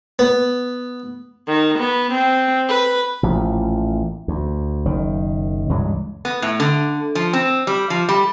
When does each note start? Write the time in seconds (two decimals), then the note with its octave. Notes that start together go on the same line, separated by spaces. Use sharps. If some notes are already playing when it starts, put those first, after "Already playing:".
0.19 B3
1.47 D#3
1.79 B3
2.12 C4
2.69 B4
3.23 A1 A#2 F3
4.28 D2
4.85 F#1 D#3
5.69 C#2 G2 E3 G#3
6.25 B3
6.42 A2
6.60 D3
7.15 F3
7.33 C4
7.67 G3
7.90 F3
8.09 G3